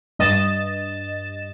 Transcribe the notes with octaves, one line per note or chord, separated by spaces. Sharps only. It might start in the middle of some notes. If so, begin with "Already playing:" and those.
G2 D#5 A6 E7